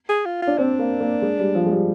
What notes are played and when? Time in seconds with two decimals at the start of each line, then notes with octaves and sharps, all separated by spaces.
0.09 G#4
0.25 F4
0.42 F4
0.47 D4
0.58 C4 D4
0.79 A#3
1.01 A#3
1.22 G#3
1.39 G3
1.55 F3
1.66 G#3
1.71 G3